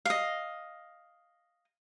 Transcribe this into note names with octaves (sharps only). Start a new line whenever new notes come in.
D#5 F5